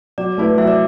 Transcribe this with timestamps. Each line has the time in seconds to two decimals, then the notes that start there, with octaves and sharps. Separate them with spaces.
0.18 F#3 D5
0.38 A3 E4 B4
0.58 F#3 E5
0.67 D5